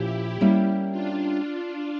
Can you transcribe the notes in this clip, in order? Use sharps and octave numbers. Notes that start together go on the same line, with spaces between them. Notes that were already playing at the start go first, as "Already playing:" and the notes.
Already playing: A#2 F3 C#4 E4 G4
G3 A#3 C#4 E4 G4
D4 F4